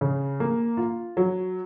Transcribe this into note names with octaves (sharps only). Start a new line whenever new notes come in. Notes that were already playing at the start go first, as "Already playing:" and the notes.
C#3
A#3
F4
F#3